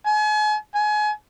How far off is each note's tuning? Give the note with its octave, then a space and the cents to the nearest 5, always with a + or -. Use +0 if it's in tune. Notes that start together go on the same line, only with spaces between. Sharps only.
G#5 +40
G#5 +30